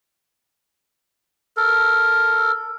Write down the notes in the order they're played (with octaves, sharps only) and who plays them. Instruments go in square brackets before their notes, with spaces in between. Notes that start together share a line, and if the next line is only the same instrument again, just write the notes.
[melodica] A4 A#4